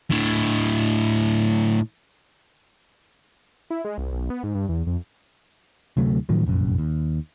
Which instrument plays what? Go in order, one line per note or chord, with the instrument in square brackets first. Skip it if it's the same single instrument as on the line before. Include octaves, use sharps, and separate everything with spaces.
[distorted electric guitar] A2 D3
[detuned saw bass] E4
G#3
C2
B1
B3
G#2
G2
E2
F2
[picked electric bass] D2 C3 F#3 A3
A2 D#3 F3 F#3
F1 A#1 F#2
D#2